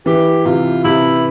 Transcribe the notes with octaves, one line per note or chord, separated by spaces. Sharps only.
E3 G4
C3 F4
C3 E4